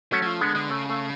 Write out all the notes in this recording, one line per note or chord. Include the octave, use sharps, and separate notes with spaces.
F#3 A3 C#4
F#3
F3
D3 G#3 B3
D3
C#3 A3
A3